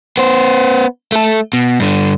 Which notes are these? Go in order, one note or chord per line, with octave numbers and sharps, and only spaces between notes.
B3 C5
A3 A4
B2
G2 D3